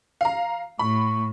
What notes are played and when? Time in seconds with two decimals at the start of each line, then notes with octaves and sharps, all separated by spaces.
0.21 F5 A#5
0.79 A2 B5 C#6